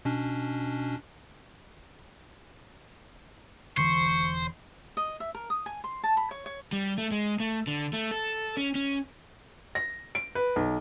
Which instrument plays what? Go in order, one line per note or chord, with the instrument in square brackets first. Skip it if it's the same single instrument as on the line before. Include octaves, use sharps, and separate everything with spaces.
[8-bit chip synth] B2 C#4 D4
[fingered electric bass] E1 D3 E3 [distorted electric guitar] C5 [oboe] C#6
[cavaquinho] D#5
E5
A#4
D#6
G#5
C6
A5
B5
C#5
C#5
[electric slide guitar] G3
A3
G#3
A3
D3
A3
A4
C#4
C#4
[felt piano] A#6
D7
B4
B1